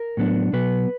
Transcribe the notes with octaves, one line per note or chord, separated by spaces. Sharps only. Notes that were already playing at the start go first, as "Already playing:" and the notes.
Already playing: A#4
A2 F#3 B3 D4
B2 F#3 B3 B4